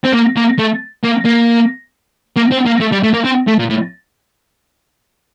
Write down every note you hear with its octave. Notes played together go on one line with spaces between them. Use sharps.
C4
A#3
A#3
A3
A#3
A#3
A#3
C4
A#3
A3
G3
A3
A#3
C4
A3
A#2
A2